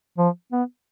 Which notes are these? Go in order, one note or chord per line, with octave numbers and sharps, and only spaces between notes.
F3
B3